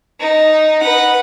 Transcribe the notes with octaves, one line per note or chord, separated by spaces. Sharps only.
D#4
B4 F#5